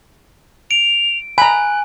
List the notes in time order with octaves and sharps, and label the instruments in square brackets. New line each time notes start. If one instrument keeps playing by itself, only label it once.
[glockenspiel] D7 [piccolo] F7
[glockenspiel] G#5 [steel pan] A#5 B5 [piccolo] F#6